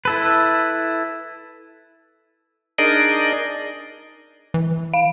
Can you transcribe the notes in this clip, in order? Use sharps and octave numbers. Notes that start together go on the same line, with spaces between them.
E4 A4 B4
D4 D#4 G#4 A#4 D5 D#5
E3
F5